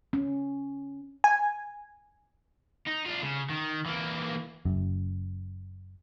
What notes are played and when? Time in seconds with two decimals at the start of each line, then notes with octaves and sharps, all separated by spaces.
0.13 C#4
1.24 G#5
2.87 D#4
3.06 D4 F4
3.23 C#3
3.50 D#3
3.86 E3 A#3
4.65 F#1 F#2